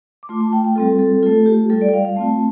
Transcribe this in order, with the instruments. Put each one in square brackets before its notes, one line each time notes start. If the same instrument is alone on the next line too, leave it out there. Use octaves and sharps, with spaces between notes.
[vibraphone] D6
A3 F4 C6
A5
G5
G5
G3 C4 F4 A4
A4
A3 F4 A4
G4
G3 F4 A4
D5
G5
F5
F5
A3 C4 F4 A5